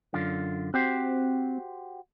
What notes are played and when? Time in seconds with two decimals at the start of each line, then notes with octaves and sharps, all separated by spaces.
0.14 F#2 D3 F4
0.74 C4 F#4 G4 C5